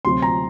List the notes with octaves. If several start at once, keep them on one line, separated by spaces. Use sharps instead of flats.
D2 C3 F#3 C4 C6
A#5